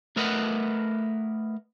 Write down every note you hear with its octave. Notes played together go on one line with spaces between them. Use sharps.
A3 A#4 B4 D#5 F#5